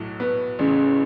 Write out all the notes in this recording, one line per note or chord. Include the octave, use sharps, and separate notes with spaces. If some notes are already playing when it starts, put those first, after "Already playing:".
Already playing: B1 A2 F#3
B3
A1 C#3